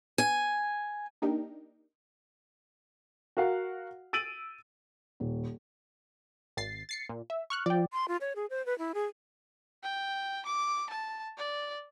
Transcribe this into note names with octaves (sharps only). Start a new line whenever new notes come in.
G#5
A#3 D4 D#4 G4 A#4
F#4 A#4 F5 F#5
E6 A6 D7 D#7 F#7
D#1
G#1 A6 C7
A6 C7 C#7
A#2
E5
C#6 F6 F#6
F3 D5 G5
C6
F4
C#5
G#4
C5
B4
E4
G#4
G5
D6
A5
D5